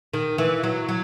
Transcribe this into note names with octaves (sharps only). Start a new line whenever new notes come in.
D#3
E3
F#3
F#3